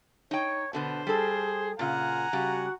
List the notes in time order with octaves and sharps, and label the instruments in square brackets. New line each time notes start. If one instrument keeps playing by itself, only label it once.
[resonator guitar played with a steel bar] D#4 G5 [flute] C#5
[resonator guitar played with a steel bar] B2 D3 B3 [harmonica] C5 [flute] A5
[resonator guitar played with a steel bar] G3 A4 [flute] G#4
[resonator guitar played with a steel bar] A#2 C#3 [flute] F4 [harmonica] F#5 G#5 A#5
[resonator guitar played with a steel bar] C#3 G3 [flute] F#4